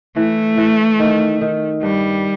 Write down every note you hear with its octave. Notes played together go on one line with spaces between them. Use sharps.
E3 A3
E3
D#3
D#3
G2 G3